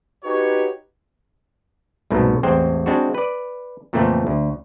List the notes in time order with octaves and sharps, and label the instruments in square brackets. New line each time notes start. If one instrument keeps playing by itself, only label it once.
[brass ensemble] D#4 F#4 G4 B4 C#5
[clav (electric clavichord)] C2 G#2 B2 A3
A1 E2 G#3 C4 C5 G5
G#3 C4 D4 E4 F#4
B4 D5
F2 A#2 C#3 E3 A3 C4
D2